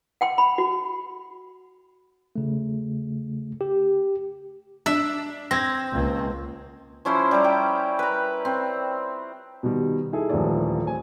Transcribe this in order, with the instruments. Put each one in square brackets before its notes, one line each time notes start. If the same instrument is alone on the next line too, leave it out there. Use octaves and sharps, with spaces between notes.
[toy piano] F#5 G5 C6
B5
F#4
[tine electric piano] C#3 A3
G4
[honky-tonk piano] D4 [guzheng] E5
[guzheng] C4 [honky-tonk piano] G#6 A#6
[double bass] C#2 A#3
[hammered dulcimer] F3 C#4 E4 C5
G3 A#5
G5
B4 A#5
C4
[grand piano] B2 D#3 G3
D#4 E4 G#4 A4
D#1 D#2 E3 F3 A3 D5
A3 C4 G#5